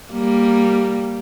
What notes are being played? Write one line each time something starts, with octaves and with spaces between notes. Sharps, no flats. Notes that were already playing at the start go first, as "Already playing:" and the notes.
G3 A#3